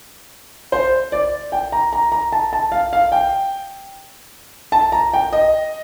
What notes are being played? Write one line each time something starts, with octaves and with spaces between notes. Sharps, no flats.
C5
D5
G5
A#5
A#5
A#5
A5
A5
F5
F5
G5
A5
A#5
G5
D#5